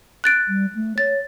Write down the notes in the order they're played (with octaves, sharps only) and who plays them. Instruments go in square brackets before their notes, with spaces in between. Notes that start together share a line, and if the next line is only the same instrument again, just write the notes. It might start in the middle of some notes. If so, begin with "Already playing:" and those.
[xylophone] F#6 A6 D7
[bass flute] G3
A3
[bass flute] C#5 [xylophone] A6